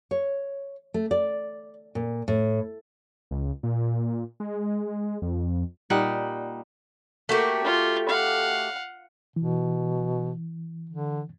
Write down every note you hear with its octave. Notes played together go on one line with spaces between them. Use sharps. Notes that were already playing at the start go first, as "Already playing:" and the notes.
C#5
A3
D5
A#2
A2
C#2
A#2
G#3
F2
A#2 G3 D#4 F#5
A3 A#3 F#4 G4
F4
F5 F#5
B2 E3
D3